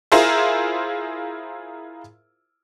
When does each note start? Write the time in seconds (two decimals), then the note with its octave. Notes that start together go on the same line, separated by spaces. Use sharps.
0.12 E4 F4 G#4 A#4 C5 E5